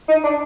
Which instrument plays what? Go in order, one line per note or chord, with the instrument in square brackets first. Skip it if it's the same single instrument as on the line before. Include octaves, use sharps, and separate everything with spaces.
[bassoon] D#4
D4